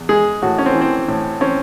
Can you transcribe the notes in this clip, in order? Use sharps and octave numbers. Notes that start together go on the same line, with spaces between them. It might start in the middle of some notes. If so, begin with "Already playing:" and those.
Already playing: E2
G#3 G#4
A2 F#4
C#4
C4
E3
C4
A2
C4 C#4